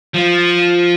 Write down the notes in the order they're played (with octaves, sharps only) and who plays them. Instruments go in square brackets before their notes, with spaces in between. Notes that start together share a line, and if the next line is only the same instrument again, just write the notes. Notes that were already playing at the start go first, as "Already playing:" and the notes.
[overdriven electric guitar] F3